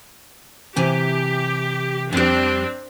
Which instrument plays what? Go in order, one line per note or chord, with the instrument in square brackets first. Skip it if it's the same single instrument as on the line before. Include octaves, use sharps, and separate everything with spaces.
[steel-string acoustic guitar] C3 E3 G#5 [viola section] G4
[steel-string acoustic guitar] F2 G3 [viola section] C4 D4